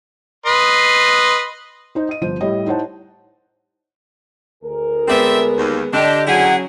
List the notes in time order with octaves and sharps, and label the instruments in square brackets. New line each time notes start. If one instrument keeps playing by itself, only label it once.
[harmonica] B4 D#5 C6
[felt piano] D#4 C5
D#5 D#7
G1 F3 C5 D#7
A2 G3 E4 C#5 D#5
D#4 E4 C5 C#5 F#5 A5
[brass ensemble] D2 G#4 A#4
[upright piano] G#3 B3 [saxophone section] C4 D5 E5
[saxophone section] D#2
[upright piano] D3 [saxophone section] D4 G4 [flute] D#5
[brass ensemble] C#3 F#3 [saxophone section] E4 G4 G#4 [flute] F#5